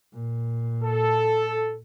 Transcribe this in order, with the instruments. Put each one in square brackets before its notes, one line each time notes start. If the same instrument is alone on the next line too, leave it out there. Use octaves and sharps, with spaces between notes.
[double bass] A#2
[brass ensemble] A4